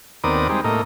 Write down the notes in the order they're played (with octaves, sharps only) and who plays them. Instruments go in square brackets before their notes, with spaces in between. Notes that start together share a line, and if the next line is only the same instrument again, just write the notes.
[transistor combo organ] D#2 B3 C4 A#4 D5 D#6
G3 G#3 C4 D#4
A2 A#3 D#5